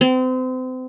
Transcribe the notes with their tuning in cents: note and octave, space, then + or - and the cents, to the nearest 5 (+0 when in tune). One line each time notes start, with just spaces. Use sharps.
C4 -35